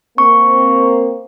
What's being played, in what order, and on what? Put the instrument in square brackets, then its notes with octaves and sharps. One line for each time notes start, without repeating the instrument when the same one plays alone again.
[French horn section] A#3 C4 [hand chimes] C#6